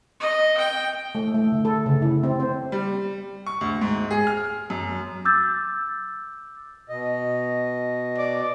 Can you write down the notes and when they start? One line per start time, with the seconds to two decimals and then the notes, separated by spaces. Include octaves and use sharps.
0.20 D#5
0.57 G5
1.15 A3
1.34 A3
1.52 D3
1.65 A4
1.86 C#3
2.02 E4
2.23 C4
2.40 C5
2.72 G3
3.46 C#6
3.61 D2
3.81 G#2
4.11 G#4
4.27 F6
4.70 F#2
5.25 D6 E6 G6 A6
6.89 B2 D#5
8.18 D5